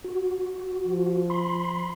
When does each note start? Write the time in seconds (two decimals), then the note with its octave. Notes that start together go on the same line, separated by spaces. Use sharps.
0.04 F#4
0.84 F3
1.30 B5 C6